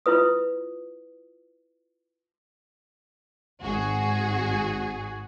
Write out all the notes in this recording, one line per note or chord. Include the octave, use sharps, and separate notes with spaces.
E4 F4 B4 D#6
G#1 F#4 G#4